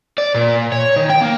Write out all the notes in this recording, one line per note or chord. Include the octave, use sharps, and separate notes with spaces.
D5
A#2
C#5
D#3
G5
A#3